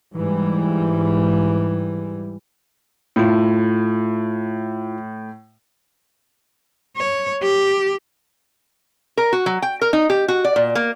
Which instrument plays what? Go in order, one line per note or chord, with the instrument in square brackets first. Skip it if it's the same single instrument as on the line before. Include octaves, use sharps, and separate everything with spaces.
[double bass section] G#2 E3 G3
[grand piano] A2 [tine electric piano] E4 F4
[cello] C#5
G4
[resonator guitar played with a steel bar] A#4
F#4
F#3
G5
A#4
D#4
G4
F#4
D5
A#2
A#3